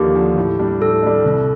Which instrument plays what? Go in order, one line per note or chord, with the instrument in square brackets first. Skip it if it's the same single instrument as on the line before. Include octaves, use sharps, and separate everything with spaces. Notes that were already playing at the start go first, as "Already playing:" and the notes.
Already playing: [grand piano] D#2 D3 F3 A#3 [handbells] G4
[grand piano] D3 F3 A#3
A2
G3 D4
[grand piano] A2 [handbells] A4
[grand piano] G3 D4
C2